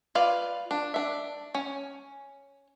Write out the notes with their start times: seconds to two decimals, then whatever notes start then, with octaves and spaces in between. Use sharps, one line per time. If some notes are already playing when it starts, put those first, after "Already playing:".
0.15 F4 B4 D5 F5
0.71 D4
0.94 D4 E5
1.55 C#4